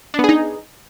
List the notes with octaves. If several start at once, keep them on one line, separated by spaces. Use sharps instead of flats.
B3 D4 D#4 G#4